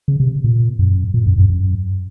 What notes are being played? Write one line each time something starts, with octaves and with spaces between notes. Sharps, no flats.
C#3
C3
A#2
F#2
A#2
F#2
F#2
F#2